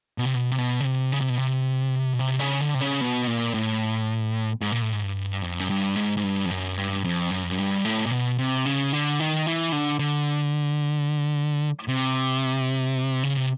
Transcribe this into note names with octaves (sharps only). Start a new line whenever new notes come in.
B2
C3
B2
C3
B2
C#3
C3
C#3
C3
B2
C3
B2
C3
C#3
D3
C3
C#3
B2
A#2
A2
G#2
A#2
A2
G#2
G2
F2
F#2
G2
G#2
G#2
G2
F2
F#2
G2
F2
F#2
F2
F#2
G2
A2
A#2
B2
C3
C#3
D3
D#3
E3
D3
D3
C3
C#3
C3